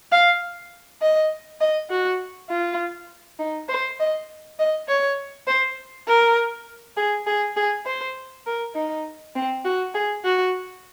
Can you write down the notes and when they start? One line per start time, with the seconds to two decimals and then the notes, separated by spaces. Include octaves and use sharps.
0.12 F5
1.02 D#5
1.61 D#5
1.90 F#4
2.50 F4
3.39 D#4
3.69 C5
4.00 D#5
4.59 D#5
4.88 C#5
5.47 C5
6.08 A#4
6.97 G#4
7.27 G#4
7.56 G#4
7.86 C5
8.47 A#4
8.75 D#4
9.36 C4
9.65 F#4
9.95 G#4
10.24 F#4